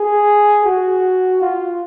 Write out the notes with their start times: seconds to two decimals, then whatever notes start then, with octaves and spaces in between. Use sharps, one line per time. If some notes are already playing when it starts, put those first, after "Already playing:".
Already playing: G#4
0.65 F#4
1.42 F4